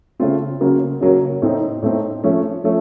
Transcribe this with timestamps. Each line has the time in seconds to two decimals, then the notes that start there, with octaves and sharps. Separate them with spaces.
0.20 C#3 A3 C4 F4
0.61 C#3 F#3 A#3 C#4
1.01 C#3 F#3 A#3 C#4
1.42 A2 A3 C4 D#4
1.82 A2 A3 C4 D#4
2.24 F3 A3 C#4
2.64 F3 A3 C#4